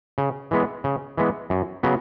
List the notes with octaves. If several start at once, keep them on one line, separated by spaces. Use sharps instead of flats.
C#3
E3 G#3 B3
C#3
E3 G#3 B3
F#2
C#3 F#3 B3